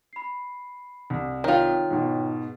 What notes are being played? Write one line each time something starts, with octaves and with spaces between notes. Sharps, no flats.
B5 C7
C2
D#3 F4 C#5 G5
G#2 B2